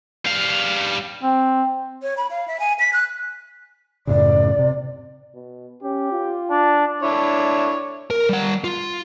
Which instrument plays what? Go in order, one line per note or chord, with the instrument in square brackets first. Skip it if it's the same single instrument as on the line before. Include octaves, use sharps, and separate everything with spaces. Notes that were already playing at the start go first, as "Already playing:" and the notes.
[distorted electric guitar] G3 F5
[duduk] C4
[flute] C#5
B5
F5
E5
G#5
B6
F#6
[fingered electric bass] F#2 A2 C#3 [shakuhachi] D5
[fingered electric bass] C3
[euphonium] B2
[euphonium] C#4 [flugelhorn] G4
[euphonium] F4
[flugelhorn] D4
[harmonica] D4 E4 C#5
[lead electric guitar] A#4
G3 F#5
F4